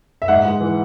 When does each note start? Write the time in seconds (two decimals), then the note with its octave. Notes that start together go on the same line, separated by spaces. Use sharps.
0.22 E5
0.28 G#2 F#5
0.45 G#3
0.60 E3